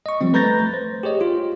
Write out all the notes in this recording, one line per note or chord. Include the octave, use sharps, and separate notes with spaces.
D#5 C#6
F3 G3 C4
A3 B4 A#5 G6 A6 A#6
C5
G4 G#4 C#5 D#5
F4